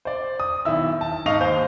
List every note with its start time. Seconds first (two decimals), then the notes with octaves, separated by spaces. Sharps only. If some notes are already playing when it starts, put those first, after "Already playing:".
0.05 C5 D5
0.40 D#6
0.65 B1 D#3 E4 E6
1.01 A5
1.26 G#2 D#4 D#5 F5 C#6 F7
1.40 D#2 C5 G6